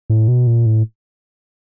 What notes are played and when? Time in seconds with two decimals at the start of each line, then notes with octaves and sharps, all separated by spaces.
0.10 A2
0.28 B2
0.47 A#2
0.66 A2